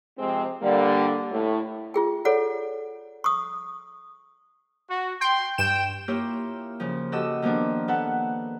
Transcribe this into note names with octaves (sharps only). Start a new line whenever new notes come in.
C3 F3 G#3 C4
D3 G3 A#3
A2
F4 G#4 G5
A4 C#5 D5 F#5
C#6 D#6
F#4
G5 C6
G2 G5 E7
A#3 E4 F4 G4 C#5
C#3 F3
F#4 G4 A4 D#5 E6
D#3 F3 A#3 B3 D4
B3 A4 B4 F#5